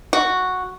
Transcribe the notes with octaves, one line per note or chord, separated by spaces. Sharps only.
F#4